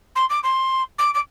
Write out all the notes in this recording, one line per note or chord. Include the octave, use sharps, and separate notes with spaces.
C6
D6
C6
D6
D6